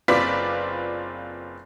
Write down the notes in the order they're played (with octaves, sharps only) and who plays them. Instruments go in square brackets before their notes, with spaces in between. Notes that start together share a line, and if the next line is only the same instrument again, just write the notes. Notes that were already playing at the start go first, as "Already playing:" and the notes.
[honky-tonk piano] F#1 C4 F4 B4 D5 B6